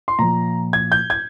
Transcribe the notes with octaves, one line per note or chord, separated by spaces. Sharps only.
C6
A#2 F3 A#5
G#6
G6
G#6